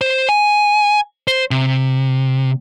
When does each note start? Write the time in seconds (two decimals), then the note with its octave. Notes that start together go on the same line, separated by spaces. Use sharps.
0.01 C5
0.29 G#5
1.28 C5
1.51 C3